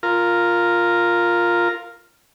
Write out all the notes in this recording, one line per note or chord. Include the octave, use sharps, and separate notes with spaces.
F4 A#4